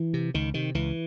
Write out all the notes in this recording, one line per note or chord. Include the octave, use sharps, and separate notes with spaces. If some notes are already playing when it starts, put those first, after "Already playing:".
Already playing: E3
C3
C#2 D#3
C3 D#3
C#2 E3